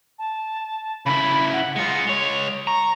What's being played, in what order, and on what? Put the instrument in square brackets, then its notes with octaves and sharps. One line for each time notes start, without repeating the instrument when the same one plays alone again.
[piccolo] A5
[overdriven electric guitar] C#3 E4 [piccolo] B5
[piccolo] F#5
[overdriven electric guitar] G#3 F4 [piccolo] C#7
[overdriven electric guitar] G#3 C#5 [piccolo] F7
[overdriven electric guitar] A#5 [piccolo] C#6